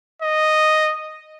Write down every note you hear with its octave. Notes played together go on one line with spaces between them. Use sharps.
D#5